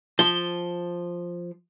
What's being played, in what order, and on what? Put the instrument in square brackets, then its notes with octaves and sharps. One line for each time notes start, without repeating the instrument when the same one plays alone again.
[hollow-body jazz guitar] F3 [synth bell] G7